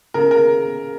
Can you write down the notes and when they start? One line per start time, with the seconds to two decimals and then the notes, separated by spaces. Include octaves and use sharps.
0.14 C#3 A#4
0.31 A#4